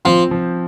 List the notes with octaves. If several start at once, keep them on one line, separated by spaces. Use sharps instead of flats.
F3 C4
F3